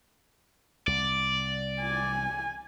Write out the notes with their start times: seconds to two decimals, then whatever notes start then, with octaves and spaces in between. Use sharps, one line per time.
0.87 C2 D5
1.82 G#5